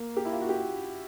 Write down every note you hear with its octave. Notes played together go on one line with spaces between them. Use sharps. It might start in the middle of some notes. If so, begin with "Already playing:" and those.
Already playing: A#3
G4
E4
F4
F#4
G4